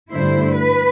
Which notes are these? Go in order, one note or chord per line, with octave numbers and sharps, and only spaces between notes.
G2 D3 A3 E4 C5
B4